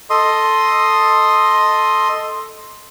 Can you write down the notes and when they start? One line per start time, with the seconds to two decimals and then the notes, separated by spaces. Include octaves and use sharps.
0.10 A4 D#5 C6 D#6